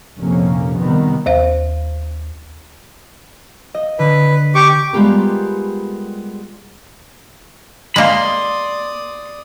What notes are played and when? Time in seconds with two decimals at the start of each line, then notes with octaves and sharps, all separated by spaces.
0.19 F1 A#1 F2 C3 A#3 C#4
0.77 C3 D#3 G3 B3
1.26 D#2 C5 F5
3.74 D#5
3.99 D3 B4
4.55 G4 C#6 D6
4.93 G3 G#3 B3 F4 G4 A#4
7.96 G#3 A#3 D5 B5 C6 D#6